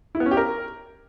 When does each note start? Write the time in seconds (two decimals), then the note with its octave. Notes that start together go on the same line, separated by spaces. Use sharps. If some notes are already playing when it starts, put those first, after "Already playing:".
0.15 E4
0.20 B3
0.26 C#4
0.31 G4
0.37 A#4